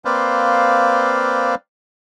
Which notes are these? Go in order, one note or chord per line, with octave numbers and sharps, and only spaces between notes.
A#3 C4 B4 C5 D5 F5